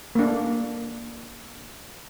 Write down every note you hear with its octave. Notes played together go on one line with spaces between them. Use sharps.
A#3 D4